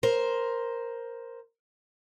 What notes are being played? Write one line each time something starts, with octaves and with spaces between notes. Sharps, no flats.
A#4 C5